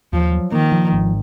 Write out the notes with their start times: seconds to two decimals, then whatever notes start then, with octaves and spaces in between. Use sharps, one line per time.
0.13 D#2 F3
0.32 F#3
0.52 D#3 A#3
0.72 F3
0.92 G#1